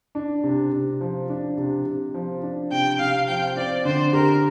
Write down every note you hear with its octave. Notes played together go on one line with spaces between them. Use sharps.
D4
C3
C3
F3
D4
C3
C3
F3
D4
C3 G5
C3 F5
F3 G5
C4 D5
D3 C5
G4 A#4